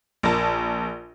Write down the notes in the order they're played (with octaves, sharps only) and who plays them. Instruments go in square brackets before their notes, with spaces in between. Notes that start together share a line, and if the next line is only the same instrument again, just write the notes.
[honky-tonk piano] A#1 A#4 A5